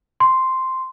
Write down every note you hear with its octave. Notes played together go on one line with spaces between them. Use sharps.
C6